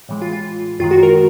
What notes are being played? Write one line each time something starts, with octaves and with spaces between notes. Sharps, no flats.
A2 E3 G#3
F4
F4
F#2 D#3 G#3 F4
F#4
A#4